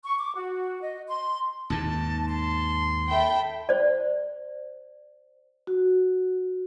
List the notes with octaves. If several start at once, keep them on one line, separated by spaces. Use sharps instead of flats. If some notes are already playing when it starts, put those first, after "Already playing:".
C#6
D6
F#4
D#5
C6
D#2 G#2 D#3 A5
A5 C6
A4 E5 G5 B5
C5 D5
F#4